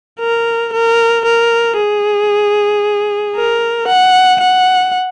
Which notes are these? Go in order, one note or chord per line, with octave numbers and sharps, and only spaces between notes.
A#4
A#4
A#4
G#4
A#4
F#5
F#5